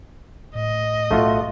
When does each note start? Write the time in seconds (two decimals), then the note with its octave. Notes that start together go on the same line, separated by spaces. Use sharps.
0.55 A2 D#5
1.11 B1 A3 F4 F#4